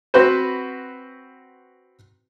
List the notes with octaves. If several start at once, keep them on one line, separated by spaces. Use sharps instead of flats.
C4 F#4 B4 C5